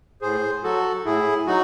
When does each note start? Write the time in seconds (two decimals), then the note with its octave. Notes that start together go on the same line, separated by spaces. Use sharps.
0.22 A2 G#4 C5
0.64 F#3 F#4 A4
1.05 A2 E4 G#4
1.47 F#3 D#4 F#4